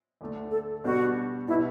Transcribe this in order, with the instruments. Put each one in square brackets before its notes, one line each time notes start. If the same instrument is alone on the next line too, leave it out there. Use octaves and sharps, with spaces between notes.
[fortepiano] D2 D3 A3
[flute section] A4
[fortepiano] B2 G3 B3 D4 [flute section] F#4
[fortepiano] B2 G3 B3 D4 [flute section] E4